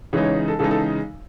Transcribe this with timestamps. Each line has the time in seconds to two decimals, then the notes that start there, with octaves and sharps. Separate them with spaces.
0.13 C#3 E3 G#3 D#4 C#5
0.24 C#5
0.48 A4
0.59 C#3 E3 G#3 D#4 A4
0.71 A4